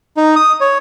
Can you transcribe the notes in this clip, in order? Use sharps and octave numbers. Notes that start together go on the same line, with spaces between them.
D#4
D#6
C#5